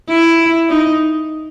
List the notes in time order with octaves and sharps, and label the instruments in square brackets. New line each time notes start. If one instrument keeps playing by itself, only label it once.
[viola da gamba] E4
D#4